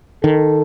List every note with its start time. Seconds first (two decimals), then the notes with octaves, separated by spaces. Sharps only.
0.24 D#3 A4